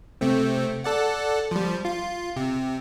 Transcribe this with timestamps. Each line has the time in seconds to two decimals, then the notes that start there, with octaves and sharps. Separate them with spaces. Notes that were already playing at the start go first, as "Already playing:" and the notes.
0.21 C3 A3 C4
0.84 A4 D5 F#5
1.51 F3 G3
1.85 F4
2.36 C3